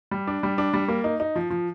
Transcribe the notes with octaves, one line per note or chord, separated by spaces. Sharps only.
G3
D4
G3
D4
G3
A#3
D#4
D#4
F3
F3